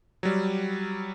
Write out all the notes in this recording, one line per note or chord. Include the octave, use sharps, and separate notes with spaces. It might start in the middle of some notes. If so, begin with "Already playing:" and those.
F#3 G3